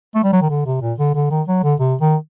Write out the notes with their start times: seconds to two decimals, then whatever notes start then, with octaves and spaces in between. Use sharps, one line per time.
0.15 A3
0.24 G3
0.33 F#3
0.41 D#3
0.50 D3
0.66 C3
0.82 A#2
0.98 D3
1.15 D3
1.31 D#3
1.47 F#3
1.63 D3
1.80 C3
2.01 D#3